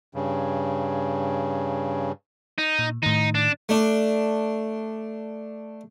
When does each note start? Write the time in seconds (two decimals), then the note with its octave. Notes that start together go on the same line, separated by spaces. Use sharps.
0.14 G2 C#3
2.58 D#4
2.79 A#2
3.03 A2 D#3 D#4
3.35 D4
3.69 A3 D4